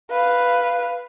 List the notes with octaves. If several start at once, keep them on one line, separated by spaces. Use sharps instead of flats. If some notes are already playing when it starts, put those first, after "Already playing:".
B4 F5